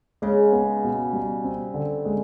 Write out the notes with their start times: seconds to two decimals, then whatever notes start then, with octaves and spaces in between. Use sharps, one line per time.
0.22 C#3 G#3
0.52 B3
0.84 B2
1.13 G3
1.44 C4
1.74 D3
2.05 G#3